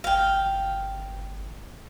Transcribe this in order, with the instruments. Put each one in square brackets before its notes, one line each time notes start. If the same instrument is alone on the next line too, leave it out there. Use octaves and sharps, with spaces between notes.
[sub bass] G1 [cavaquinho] F5 G5